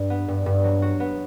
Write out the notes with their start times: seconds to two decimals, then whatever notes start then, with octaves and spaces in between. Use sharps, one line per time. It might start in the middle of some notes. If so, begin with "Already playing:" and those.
Already playing: G2
0.10 B3
0.28 G2
0.46 G2
0.64 F#3
0.82 F#4
1.00 B3